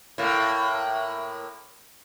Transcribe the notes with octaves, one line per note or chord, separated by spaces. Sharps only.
A2 A#3